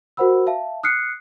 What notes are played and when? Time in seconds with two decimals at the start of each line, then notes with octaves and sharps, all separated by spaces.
0.17 F#4 A#4 C5 F#5 B5 E6
0.46 E5 F5 A5
0.83 D#6 F6 F#6 C7 C#7